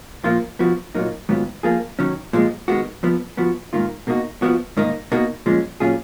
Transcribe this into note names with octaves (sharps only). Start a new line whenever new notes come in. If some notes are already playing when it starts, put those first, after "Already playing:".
A#2 F3 A#3 F4
F2 F3 B3 F#4
A#2 F#3 A#3 D#4
G#2 D#3 F#3 B3 F4
F3 A#3 F4 G#4
D#3 F#3 C#4
A#2 F3 G#3
D#3 G#3 B3 F#4
F2 F3 B3
F3 B3 F#4
G#2 D#3 A#3 F4
B2 A#3 D#4 F#4
F2 F3 B3 F#4
G#2 D#3 A#3 D#4
B2 A#3 D#4 F#4
A#2 F3 G#3 C#4
A#2 F#3 C#4 F4 G#4